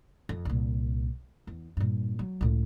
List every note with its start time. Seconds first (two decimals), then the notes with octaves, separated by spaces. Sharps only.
0.29 F2
0.45 C2 A#2
1.47 E2
1.77 G2 A#2
2.19 F#3
2.41 C#2 A2